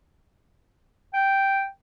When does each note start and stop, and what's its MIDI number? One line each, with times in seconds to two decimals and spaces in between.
1.14 1.65 79